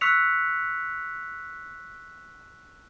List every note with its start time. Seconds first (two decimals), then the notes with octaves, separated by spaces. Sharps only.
0.01 C#6 E6 F#6 B6 C#7 F7